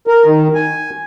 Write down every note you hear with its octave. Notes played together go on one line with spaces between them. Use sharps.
A#4
D#3
G#5